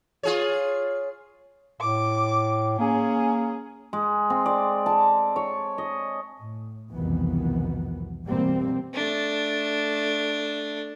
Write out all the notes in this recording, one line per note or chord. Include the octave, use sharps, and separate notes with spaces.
F4 G#4 C#5
A2 D6
A#3 C#4 G#4
G#3
C4
D5
A5
C#5
D#5
A2
C2 F2 B2 D#3 E3 B3
B2 E3 G3 A#3 C4
A3 D4